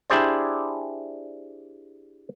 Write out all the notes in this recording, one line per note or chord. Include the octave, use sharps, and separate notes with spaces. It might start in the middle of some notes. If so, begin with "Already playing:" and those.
D4 E4 G4 G#4 C5 D5